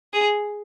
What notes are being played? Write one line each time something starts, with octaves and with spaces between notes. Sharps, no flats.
G#4